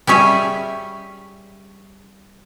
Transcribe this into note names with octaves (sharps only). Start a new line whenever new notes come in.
G3 C#4 G#4 E5